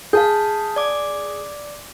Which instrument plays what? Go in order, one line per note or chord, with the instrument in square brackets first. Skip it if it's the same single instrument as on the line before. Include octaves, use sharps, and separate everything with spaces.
[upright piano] G#4 [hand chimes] F5 A5 G6
[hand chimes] D5 D6